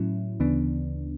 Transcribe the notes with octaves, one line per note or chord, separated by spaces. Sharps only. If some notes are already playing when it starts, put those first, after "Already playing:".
Already playing: A2 F#3 C#4 E4
D2 C#3 E3 B3 D4